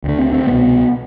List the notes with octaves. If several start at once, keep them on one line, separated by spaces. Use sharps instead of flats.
D2 D3
C4
C4
C2 B2 B3